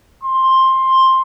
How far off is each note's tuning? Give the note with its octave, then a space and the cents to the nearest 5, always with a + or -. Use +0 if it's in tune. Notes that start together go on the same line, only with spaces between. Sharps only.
C6 +10